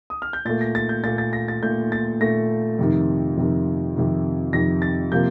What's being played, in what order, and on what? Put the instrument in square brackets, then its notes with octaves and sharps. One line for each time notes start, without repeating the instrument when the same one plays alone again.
[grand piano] D#6
F6
G6
A#2 A6
A3
A#6
A6
G6
A#2 A3 A6
A6
A#6
A6
A#2 A3 G6
A6
A#2 A3 A#6
F2 C3 D#3
F2 C3 D#3
F2 C3 D#3
F2 C3 D#3 A#6
A6
C3 F3 A#3 G6